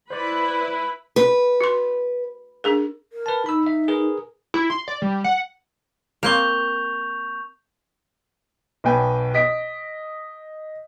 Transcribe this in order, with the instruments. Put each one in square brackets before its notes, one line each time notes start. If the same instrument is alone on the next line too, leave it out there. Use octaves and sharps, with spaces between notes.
[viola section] E4 B4 B5 [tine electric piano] C5 D5
[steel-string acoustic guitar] B4
[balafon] F#4 C6
D4 G#4 A#4
[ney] A#4
[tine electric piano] B4 A5
[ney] D#4 [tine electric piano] B5 E6
[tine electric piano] E5
G#4 A#4 B4
[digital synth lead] E4
C6
D5
G3
F#5
[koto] A#3 C4 [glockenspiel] C#6 G6 F7
[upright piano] B1 B2 B4 G5 G#5
D#5 B6 D7